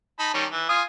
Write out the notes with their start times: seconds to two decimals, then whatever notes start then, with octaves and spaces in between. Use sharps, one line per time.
0.19 D#4 A5 B5
0.34 D#3 G3 C#4
0.51 E3
0.69 F4 G#5 D#6